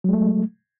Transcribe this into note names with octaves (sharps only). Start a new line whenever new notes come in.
F#3 G#3 A3